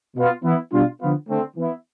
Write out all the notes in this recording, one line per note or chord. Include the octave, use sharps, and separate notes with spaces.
B2 B3 F4
E3 B3 E4
B2 G3 D4 F4
D3 F3 B3 F4
D3 A3 C4
E3 B3 E4